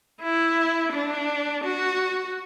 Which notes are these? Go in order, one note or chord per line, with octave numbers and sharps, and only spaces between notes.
E4
D4
F#4